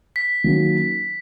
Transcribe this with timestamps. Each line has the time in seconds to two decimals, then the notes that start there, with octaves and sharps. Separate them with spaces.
0.16 B6
0.44 D#3 F#3 A#3 C#4